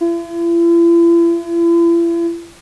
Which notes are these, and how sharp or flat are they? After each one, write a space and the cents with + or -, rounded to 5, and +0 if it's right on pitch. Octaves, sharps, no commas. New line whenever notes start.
E4 +45